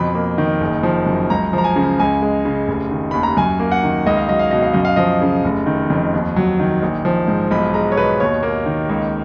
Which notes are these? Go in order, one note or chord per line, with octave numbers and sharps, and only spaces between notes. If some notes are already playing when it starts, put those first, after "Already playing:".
Already playing: F2 B2 B5
A#3
D#3
F#1
F3
F#2
C#2 A#5
F3
A#5
G#5
C#3
C#2 G#5
G#3
C#3
F1
D#3
D#2 B5
A#5
F#2 G#5
A#3
F#5
D#3
C#2 D#5
F5
F#3 D#5
F5
B2 D#5
F5
F#2 D#5
F5
F3 D#5
C#3
F1
D#3
F2
D#2
F#3
D#3
A#1
F3
G#2
B1 B5
G#3 A#5
C#5
B2 B4
D#2 C#5
A#3
D#3
C#2